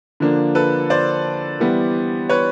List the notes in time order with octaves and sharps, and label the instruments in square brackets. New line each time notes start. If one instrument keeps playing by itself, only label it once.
[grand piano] D3 F3 A#3 D4
A4 B4
C5 D5
E3 G3 B3
B4 C#5